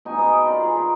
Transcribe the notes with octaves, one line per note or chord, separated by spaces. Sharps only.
B2 D#4 C#5 G#5
G#3 B3 D#5 G#5
C#5 G5
F4 F#4 A#4 D5
G#4 C#5
D#4 G4